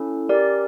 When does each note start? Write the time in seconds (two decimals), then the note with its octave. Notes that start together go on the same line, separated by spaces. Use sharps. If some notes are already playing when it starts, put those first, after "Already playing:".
Already playing: C#4 E4 A4
0.29 C#4 G4 A#4 D5